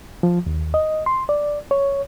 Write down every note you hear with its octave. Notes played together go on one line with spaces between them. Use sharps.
F3
D#2
D#5
C6
D5
C#5